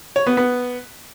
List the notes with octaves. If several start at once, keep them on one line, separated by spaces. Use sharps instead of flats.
C#5
B3
B3